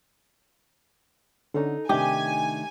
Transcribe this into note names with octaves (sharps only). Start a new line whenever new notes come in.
D3 C#4 D#4 A4 F#5
C3 D#3 A3 D4 D#4 G4 G#5